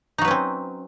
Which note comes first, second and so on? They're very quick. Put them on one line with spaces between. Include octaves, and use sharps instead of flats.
D#4 F#3 B4 C#4 C4